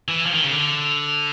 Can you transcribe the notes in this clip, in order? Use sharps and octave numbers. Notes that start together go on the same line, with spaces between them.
E3
F3
D#3
C#3
D3